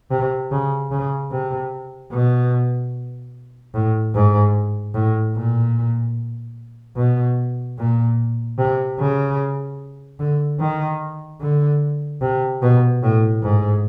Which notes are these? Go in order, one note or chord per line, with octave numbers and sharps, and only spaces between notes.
C3
C#3
C#3
C3
B2
A2
G#2
A2
A#2
B2
A#2
C3
C#3
D3
D#3
D3
C3
B2
A2
G#2